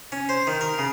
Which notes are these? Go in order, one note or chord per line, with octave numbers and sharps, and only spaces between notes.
C#4
C5
D#3
A#4
C#3